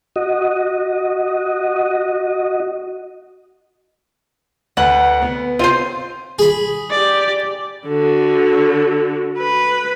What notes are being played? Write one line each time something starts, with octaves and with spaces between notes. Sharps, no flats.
F#4 D#5
D2 B4 F#5 F#7
B3
C4 F4 C5 D#7
G#4 B5
G4 D5
D3 F#4
B4